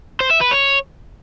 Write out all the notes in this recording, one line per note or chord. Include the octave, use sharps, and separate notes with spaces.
C5
E5
B4
C#5